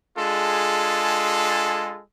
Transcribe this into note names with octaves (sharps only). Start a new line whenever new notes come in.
G#3 D4 F4 G#4 A4